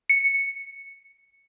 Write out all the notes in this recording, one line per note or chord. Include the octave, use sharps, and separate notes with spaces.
C#7